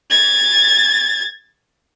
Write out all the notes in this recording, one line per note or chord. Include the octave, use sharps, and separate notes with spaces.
G#6 A6